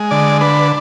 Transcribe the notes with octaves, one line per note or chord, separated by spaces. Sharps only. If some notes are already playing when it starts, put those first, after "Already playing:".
Already playing: G#3
D3 D5
D4 B4